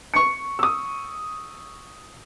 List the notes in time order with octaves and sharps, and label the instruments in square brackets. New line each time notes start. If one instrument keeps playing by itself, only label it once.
[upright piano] C#6 C#7
[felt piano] D#6 E6